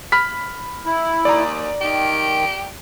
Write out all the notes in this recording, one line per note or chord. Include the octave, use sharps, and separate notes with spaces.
B5 F6 B6
E4
D#2 D5 A#5
D#3 G4